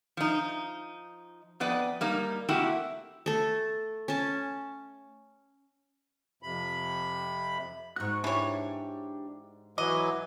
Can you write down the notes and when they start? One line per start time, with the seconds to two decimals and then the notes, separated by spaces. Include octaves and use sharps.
0.17 F3 D#4
1.60 F2 B3 B4 D5 D#5
2.01 G3 A#3 D#4
2.49 A3 A#3 C4 E4 F#4 G4
3.26 A3 A4
4.08 C#4 A5
6.43 F2 C3 B5
7.96 G#2 F#4 C#6 F#6
8.24 E3 D4 G4 C#5 G5
9.78 E3 F#3 D#5 D6